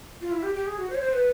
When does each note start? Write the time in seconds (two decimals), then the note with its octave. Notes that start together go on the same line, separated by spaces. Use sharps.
0.21 F4
0.32 E4
0.43 G4
0.55 G4
0.67 G#4
0.78 F#4
0.90 C5
0.95 C#5
1.00 C5
1.13 B4